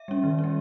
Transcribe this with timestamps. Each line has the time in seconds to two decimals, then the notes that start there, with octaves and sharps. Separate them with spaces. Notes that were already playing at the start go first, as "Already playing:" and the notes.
Already playing: E5
0.08 G3 C#4
0.23 D#3
0.39 C#4
0.44 G3